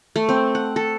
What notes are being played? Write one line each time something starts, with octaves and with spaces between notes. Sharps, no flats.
A3
C4
F#5
A4